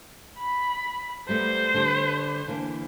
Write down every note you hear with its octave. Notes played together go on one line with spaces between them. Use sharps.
B5
G3 A3 B3 C5
D3 G3 G4
D3 E3 A#3